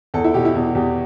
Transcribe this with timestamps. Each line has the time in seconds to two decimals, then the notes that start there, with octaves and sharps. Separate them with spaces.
0.14 E2 A4
0.24 E4
0.34 B2 G4
0.45 E4
0.55 E2
0.75 E2 G4